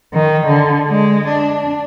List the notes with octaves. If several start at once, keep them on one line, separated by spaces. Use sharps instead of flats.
D#3
D3
G#3
D4